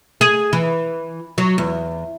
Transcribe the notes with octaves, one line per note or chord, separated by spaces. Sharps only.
G#4
E3
F#3
E2